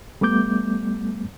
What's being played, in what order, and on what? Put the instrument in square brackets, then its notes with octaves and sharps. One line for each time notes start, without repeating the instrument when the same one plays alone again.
[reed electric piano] G3 A3 B3 D6 G6